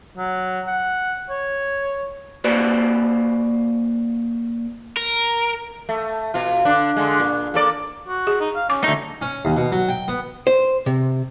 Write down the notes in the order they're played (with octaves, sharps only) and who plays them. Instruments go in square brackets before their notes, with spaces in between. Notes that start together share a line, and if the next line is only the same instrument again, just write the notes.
[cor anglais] F#3
F#5
C#5
[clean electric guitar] A#3 F#4 B4 C5 D5
[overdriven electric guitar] A#4
[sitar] A3
B2 F4
D3 D4
D3 G#3
A#2
A#3 A4 D5
[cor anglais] F#4
[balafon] G#4
[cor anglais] D#4
F5
[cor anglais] C#4 [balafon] D6
[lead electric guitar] D2 D#4 [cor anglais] A3
[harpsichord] C#4
D#2
B2
F#3
G5
B3
[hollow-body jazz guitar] C5
C3